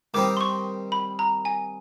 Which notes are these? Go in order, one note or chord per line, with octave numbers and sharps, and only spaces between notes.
D#3 G3 C4 D#4 D6
C6
C#6
B5
A#5
G#5